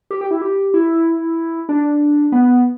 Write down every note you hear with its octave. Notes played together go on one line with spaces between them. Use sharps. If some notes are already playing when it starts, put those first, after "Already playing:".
G4
G4
E4
G4
E4
D4
B3